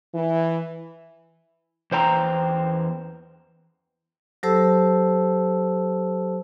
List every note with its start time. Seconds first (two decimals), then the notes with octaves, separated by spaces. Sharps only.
0.15 E3
1.92 E2 C5 G5 A#5
4.43 F#3 G4 A4 C5 A5 E6